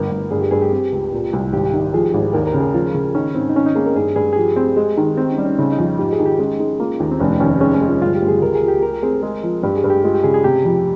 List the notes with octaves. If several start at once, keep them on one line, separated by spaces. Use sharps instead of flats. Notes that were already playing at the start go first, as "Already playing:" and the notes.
Already playing: G1 A#4
G1
G2 G#4
G4
G2 G#4
G4
C4
C#2
A#2
C2
G#1 G4
D#3
F3 G#4
G#1
D#2 A#4
A#4
C#3
G#4
F3 F4
C#3 C#4
D#3 C#4
G#2 C4
D#4
D#3 C#4
D#4
A#3 G#4
A#4
G2 G#4
G2 G#4
G#4
F3 G4
C4
G#3
D#3
C4 D#4
C#4
G3
C#4
C#3 D#4
D#4
F2
F4
G#2 G4
G#4
D#3
G4
G#3 C#4
G#3 D#4
A#3 F4
D#2
C4
F1 C#4
D#4
D#2 C#4
C4
G#3 C#4
C#4
G#3
F4
G1 F4
G4
G1
G#4
C#2 A#4
G#4
C#2
G4
G4 A#4
C4 G#4
G#3
F3
G2 G4
G#4
G2
G4
G#3 F4
G4
C#3 G#4
G#4
C3 G4
F2